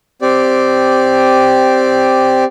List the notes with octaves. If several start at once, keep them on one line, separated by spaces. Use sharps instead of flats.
C4 G4 D5